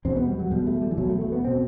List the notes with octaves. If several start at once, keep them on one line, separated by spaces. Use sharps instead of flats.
E2 B2 C4
B3
G3
F#3
E2 B2 G3
A3
G3
E3
E2 B2 F#3
A3
A3
B3
B2 C4